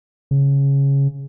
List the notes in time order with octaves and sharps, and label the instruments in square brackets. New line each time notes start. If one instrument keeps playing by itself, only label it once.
[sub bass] C#3